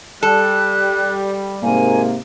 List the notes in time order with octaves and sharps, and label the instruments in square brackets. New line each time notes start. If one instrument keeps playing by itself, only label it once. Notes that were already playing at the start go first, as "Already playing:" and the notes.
[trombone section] G3 [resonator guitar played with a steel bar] A4 [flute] F#6
[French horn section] G#2 C3 A#3 [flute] G#5